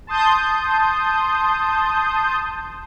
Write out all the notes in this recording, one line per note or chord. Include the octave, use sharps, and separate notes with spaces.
A5 C6 D#6 G6